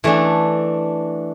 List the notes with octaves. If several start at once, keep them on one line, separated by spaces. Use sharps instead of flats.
E3 A3 D4